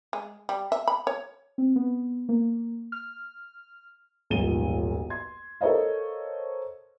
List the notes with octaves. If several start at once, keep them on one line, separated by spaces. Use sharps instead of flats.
G#3
G3
E5
B5
C#5
C4
B3
A#3
F6
D#1 B1 G#2 F3 D#7 G7
C6 G#6
A4 A#4 C5 C#5 D#5 F5